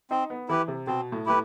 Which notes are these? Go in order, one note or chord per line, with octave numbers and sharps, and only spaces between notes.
C4 D#4
B3
E3 E4 G4 B4
C3
B2 C4
A2
A2 E4 G4 B4